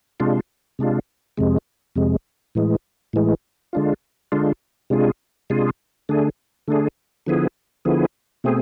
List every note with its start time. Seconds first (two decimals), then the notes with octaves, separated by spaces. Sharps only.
0.20 C3 G#3 D4 F4
0.79 C3 G#3 D4 F4
1.37 F2 C3 G#3
1.96 F2 C3 G#3
2.55 A2 E3 G#3
3.13 A2 E3 G#3
3.73 D3 G#3 D4 F4
4.32 D3 G#3 D4 F4
4.90 C3 G#3 D4 F4 G#4
5.50 C3 G#3 D4 F4 G#4
6.09 D3 A3 D4 G#4
6.68 D3 A3 D4 G#4
7.26 D3 F3 B3 E4 G#4
7.85 D3 F3 B3 E4 G#4
8.44 B2 A3 C4 G#4